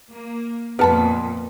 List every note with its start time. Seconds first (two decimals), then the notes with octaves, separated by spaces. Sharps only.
0.11 A#3
0.79 F2 A#2 B3 A#4 A5 B5